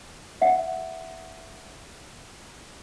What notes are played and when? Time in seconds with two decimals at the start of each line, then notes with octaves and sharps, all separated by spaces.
0.42 E5 F#5